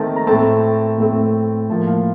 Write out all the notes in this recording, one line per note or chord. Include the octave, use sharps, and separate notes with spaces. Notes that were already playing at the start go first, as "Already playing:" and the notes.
Already playing: D#3 A3 C4 A5
A#5
A2 A3 C4 A5
A2 A3 C4
A2 F3 A#3 A5
F5